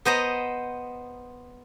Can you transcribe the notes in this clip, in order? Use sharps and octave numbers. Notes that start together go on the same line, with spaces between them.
B3 C5 D#5 A#5